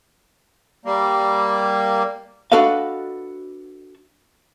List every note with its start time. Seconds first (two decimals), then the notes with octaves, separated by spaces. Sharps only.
0.85 G3 A#3
2.52 D4 F#4 A4 B4 D#5 F5